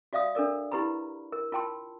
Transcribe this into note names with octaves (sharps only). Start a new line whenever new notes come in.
F#4 D5 E5 F5 D#6
D4 A4 A#4 D5
E4 G4 B4 A#5 B5
A#4
F4 A#4 G5 A5 C6